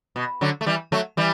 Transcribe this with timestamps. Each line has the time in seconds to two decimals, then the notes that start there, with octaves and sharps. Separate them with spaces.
0.16 B2
0.41 D3 F#3
0.61 A3
0.66 E3 G3
0.92 F#3 A3
1.17 E3 G3